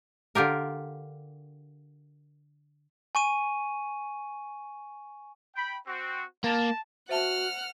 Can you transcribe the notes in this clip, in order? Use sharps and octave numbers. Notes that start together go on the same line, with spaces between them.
D3 F4 G4 A#4
G#5 C#6 D#7
G5 B5
C4 F#4
A#3 A5
F#4 C5 E5 F#5 A5 F6